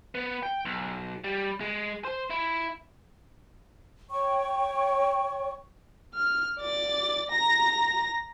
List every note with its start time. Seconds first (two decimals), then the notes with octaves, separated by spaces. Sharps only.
0.15 B3
0.43 G5
0.65 B1
1.24 G3
1.60 G#3
2.05 C5
2.30 E4
4.10 C#5 G5 C#6
6.15 F6
6.59 D5 A6
7.31 A#5 A#6